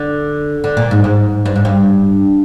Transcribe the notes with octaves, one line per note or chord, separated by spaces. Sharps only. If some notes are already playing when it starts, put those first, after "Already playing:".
Already playing: D3
D3
A#2
G#2
G#2
G2
G#2
G2